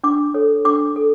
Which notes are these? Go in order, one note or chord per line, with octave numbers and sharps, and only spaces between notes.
D4 D6
A4 C#5
D4 D6
A4